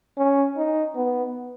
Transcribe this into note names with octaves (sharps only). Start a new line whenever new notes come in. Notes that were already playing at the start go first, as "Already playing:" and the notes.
C#4
D#4
B3